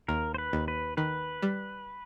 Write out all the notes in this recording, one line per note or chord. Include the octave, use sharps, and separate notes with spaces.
D#2 A#4
C5
B4
D#2
B4
D#3 B4
G3